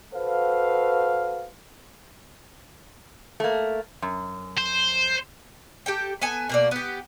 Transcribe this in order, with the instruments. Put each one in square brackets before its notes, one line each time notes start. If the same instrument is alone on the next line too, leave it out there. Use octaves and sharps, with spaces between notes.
[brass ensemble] F#4 A4 B4 C5 F5
[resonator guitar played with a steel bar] A3 A#3
F#2
[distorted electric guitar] C5
[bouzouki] G4 A4 G5
B3 A4 G#5
B2 A#3 D5
B3 G4